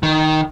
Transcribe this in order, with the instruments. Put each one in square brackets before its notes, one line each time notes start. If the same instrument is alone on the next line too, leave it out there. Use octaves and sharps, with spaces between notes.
[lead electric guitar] D#3